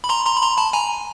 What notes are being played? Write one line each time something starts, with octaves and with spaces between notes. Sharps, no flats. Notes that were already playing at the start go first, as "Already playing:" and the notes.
B5
A#5 C6
A#5 C6
B5
A#5 C6
A5 B5
G#5 A#5